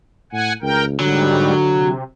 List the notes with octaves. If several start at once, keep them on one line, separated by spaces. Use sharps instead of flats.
A2 F#5 G#5
C#2 A#4 G5
G#2 D3 F#3 G3
C3